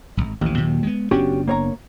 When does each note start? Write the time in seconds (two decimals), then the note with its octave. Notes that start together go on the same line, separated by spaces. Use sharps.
0.17 D1 G#1
0.41 A1 D#2 E3
0.58 A#2 D#3 F#3
0.83 G#3 B3
1.11 F#1 B3 C#4 D4 F#4 G4
1.48 A#3 C#5 A#5